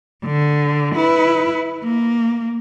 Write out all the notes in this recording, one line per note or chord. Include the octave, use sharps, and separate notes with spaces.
D3
E4 B4
A#3